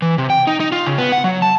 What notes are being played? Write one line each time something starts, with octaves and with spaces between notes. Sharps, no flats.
E3
C3
G5
D#4
D#4
F4
C#3
B3
F#5
F#3
A5